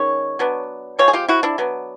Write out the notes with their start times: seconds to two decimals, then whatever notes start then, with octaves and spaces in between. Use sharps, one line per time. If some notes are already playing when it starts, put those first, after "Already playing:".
Already playing: D#3 G#3 C#4 C#5
0.39 F#3 B3 D4
0.99 F3 G#3 C4 C#5
1.08 G#4
1.13 F4 G4
1.28 E4 F#4
1.43 D4 E4
1.58 F#3 B3 D4